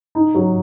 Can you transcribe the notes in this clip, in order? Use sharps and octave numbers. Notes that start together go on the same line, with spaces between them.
D#4
F#3